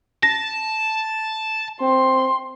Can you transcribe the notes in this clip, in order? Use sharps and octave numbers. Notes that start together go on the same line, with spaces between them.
A5 A#6
C4 C6